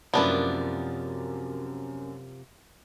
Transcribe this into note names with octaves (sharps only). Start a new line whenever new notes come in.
F#2 C3 F3 A#3 B3 D4 E4